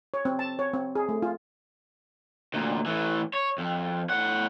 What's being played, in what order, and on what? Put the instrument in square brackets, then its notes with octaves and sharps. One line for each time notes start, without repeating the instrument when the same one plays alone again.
[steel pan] C#5
C4
A5
C#5
C4
G#4
A3
F4
[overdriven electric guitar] D2 A#2
A2 E3
C#5
F2
A2 F#5